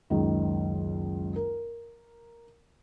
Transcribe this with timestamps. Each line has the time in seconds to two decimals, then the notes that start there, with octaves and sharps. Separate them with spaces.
0.10 F#1 C#2 D#3
1.36 A#4